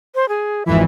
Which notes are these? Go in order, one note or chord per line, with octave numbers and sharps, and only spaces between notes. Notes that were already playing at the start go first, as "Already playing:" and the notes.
C5
G#4
G#1 F2 E3 E5